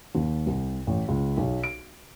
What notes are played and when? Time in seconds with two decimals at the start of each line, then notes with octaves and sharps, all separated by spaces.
0.15 D#2
0.46 C2
0.87 A1
1.08 C#2
1.37 B1
1.64 D7